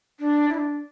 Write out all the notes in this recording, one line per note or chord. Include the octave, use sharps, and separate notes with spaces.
D4
E4
D4